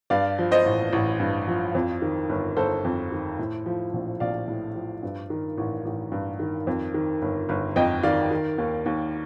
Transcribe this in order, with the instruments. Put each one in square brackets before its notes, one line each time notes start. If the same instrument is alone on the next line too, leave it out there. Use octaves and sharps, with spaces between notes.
[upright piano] G2 D5 F5
F3
C5 D#5
A1
A1
G2
F3
F2
D#3
G1
G1 A4 C5
F2
D#3
A2
F3
A#1
A#1 D5 F5
A2
F3
G2
D#3
A1
A1
G2
D#3
F2
D#3
G1
G1
F2 D#5 G5
D#3 D5 F5
D#3
D#2
D#2